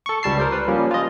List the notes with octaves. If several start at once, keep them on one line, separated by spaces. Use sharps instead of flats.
A4 C#6
C#2 G3 A5 C7
A#4 C5 D5
B4
F3 G3 A#3 C#4
F4 D#5